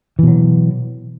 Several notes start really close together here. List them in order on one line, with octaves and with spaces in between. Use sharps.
E3 B2 F#3